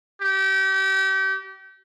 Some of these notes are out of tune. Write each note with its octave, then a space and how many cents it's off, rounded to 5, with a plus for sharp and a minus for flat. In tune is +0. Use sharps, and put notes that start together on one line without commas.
G4 -30